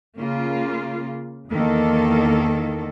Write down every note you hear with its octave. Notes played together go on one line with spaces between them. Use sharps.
C#3 A#3 F4
E2 D#3 A#3 A4